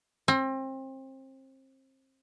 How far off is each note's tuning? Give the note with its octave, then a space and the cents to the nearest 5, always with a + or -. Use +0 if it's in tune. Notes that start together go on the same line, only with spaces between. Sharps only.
C4 +30